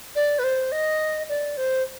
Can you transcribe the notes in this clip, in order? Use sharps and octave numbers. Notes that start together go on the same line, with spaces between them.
D5
B4
C5
D#5
D5
C5